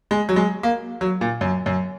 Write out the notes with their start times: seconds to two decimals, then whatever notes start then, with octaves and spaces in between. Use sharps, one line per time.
0.11 G#3
0.29 F#3
0.36 G#3
0.63 A#3
1.01 F#3
1.21 A#2
1.41 F#2
1.66 F#2